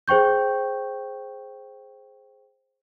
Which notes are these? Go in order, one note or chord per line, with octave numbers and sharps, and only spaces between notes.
G#4 C5 G5 C#6 G6